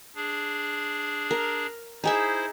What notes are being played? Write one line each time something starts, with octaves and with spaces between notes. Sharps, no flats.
D4 G#4
A#4
D#4 E4 G#4 C5 E5